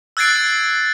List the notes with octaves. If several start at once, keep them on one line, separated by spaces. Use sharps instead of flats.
E6 F#6 G#6 A6 C7 D7